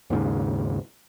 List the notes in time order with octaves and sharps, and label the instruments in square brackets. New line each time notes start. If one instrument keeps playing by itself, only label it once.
[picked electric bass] D#2 G#2 C#3